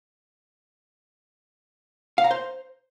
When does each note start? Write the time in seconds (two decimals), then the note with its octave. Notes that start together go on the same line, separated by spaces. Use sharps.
2.18 F5
2.24 A#5
2.31 C5